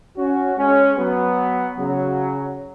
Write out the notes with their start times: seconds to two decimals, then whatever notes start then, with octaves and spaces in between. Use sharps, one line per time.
0.17 C#4 F#4
0.57 G#3 C#4
0.98 F#3 B3
1.78 C#3 F#3